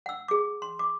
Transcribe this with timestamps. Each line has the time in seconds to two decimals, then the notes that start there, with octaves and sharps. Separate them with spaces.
0.06 F#5 E6
0.28 G#4 D6
0.62 C6
0.79 D6